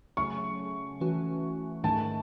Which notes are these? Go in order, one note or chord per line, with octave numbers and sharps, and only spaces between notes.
C#3 F#3 A3 C#4 C#6
E3 A3 C#4 F#4
G#2 D#3 A3 C#4 A5